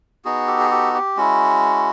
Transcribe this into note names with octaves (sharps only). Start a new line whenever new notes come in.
B3 D#4 F#4 G#4
G4 A4
G#4
G4 A4
G4
G#3 C#4 E4 F#4